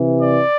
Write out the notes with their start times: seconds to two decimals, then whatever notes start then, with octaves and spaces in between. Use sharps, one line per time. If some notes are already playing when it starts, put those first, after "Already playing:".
Already playing: C3 E3
0.22 D5